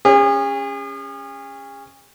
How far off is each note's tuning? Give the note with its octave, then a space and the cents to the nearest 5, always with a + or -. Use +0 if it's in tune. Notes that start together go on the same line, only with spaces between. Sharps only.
C#4 +0 G#4 -40